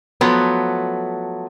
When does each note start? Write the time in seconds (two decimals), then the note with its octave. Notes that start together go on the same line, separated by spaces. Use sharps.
0.21 F3 F#3 A3 B3